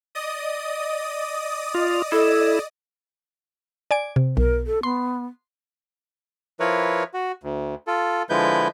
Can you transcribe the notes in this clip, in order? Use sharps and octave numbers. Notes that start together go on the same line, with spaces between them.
D5 D#5 D#6
F4
E4 A4
D5 G#5 D7
C3
B1 A#4
A4
B3 C6
F3 E4 A#4 B4 C#5
F#4
D2
F4 A4
D3 F3 G#3 E4 B4 G6